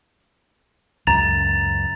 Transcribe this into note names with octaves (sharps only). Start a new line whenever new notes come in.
C#2 F#2 A#5 A6 F7